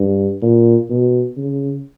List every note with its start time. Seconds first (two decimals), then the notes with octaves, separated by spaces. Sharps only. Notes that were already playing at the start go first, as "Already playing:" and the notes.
Already playing: G2
0.42 A#2
0.90 B2
1.37 C#3